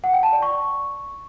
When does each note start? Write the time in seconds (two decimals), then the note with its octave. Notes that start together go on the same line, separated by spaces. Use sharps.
0.04 F#5
0.13 G5
0.23 A5
0.33 D5
0.42 C#6